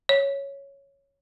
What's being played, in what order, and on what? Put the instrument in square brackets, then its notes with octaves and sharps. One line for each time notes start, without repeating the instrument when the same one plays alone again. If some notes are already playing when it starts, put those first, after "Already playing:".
[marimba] C#5